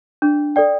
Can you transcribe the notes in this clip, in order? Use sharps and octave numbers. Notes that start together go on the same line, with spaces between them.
D4
A4 D5 G5